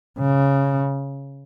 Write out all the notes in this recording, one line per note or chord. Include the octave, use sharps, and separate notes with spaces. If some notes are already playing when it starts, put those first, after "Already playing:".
C#3